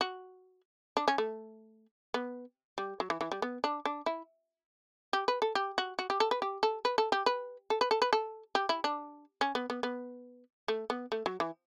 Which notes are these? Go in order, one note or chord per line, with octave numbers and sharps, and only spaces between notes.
F#4
D4
C#4
A3
B3
G3
F#3
E3
E3
G3
B3
D4
D4
E4
G4
B4
A4
G4
F#4
F#4
G4
A4
B4
G4
A4
B4
A4
G4
B4
A4
B4
A4
B4
A4
G4
E4
D4
C#4
B3
B3
B3
A3
B3
A3
F#3
E3